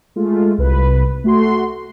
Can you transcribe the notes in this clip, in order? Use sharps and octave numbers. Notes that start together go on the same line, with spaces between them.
G#3 A3 F4
C2 B4
A3 F#4 C6